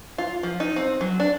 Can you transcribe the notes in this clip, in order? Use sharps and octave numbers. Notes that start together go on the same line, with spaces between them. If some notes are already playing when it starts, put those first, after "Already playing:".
F4
F3
D#4
C4
F#3
D4